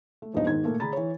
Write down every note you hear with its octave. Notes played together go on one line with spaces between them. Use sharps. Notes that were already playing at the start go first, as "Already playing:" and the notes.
A3
E1 A#1 G2 D#4 D#5
G#2 D#3 G#6
A#2 A3 A#3
D3 D4 G#4 A#5 B5 A6
E3 C#5